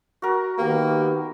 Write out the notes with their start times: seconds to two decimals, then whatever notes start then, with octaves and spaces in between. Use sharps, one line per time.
0.22 F#4 A#4
0.58 D#3 A#3 B3 G4